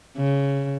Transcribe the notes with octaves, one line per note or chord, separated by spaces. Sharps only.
C#3